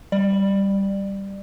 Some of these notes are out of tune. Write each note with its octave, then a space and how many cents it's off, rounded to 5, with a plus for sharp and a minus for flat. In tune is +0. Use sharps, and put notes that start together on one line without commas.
G3 +0 D5 +20